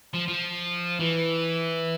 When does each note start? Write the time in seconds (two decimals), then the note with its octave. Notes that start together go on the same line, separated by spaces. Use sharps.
0.14 F3
0.28 F3
1.00 E3